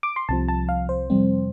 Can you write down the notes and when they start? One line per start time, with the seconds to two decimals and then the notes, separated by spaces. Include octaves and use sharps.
0.03 D6
0.16 C6
0.29 C2 C3 F3 A5
0.49 A5
0.69 F5
0.89 C5
1.10 F2 C3 G3 C4